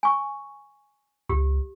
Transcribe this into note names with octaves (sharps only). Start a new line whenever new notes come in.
G#5 C#6
C#2 G4